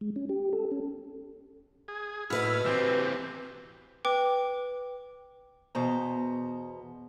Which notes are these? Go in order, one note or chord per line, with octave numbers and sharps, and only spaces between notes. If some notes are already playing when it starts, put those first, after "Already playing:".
G#3
C#4
G4
A4
C#4
G#4
A2 E4 F#4 B4 D#5 F6
E3 C4 G4
B4 G5 D6
E2 B2 C5 A#5